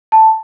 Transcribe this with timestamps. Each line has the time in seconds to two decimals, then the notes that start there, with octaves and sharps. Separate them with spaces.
0.12 A5